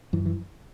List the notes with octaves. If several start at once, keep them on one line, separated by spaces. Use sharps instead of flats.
F#2 E3
E3